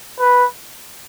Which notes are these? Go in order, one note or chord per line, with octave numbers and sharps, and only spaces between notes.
B4